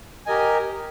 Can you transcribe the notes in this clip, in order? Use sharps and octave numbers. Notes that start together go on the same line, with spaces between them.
G4 A#4 D#5 G#5